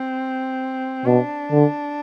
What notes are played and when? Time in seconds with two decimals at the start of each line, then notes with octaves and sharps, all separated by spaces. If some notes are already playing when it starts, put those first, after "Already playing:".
Already playing: C4
1.05 B2 D4
1.51 D3